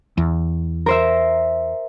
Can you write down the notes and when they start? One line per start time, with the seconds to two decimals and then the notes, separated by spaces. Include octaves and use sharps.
0.18 E2
0.86 A#4 C5 E5